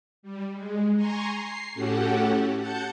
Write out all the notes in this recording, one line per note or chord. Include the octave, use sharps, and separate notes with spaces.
G3
G#3
G#5 A#5 C6 C#6
C7
A2 C#4 F#4 G4 A4 F#5
F#5 A5 G6 C#7